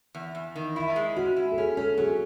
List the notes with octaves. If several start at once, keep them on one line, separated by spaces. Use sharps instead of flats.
E2
E2
D#3
E4
G#3
C#4 F#4
E4
A4
C#4 G#4
C#4 A4
F#3 G#4